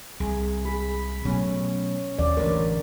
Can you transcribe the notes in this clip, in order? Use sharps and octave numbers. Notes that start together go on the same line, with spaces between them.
C2 G#4
G#4 B5
B2 F#3 A3 C#4
D#2 D5
A1 G2 D3 E3 A#4